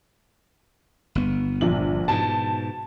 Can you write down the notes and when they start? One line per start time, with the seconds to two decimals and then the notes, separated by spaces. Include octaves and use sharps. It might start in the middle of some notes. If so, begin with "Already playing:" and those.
1.15 G1 B3
1.61 A#1 F#7
2.08 G#2 B2 A5